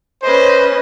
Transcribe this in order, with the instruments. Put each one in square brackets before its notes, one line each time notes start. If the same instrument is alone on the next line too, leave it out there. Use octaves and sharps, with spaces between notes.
[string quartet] C#4 B4 D#5 [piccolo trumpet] C5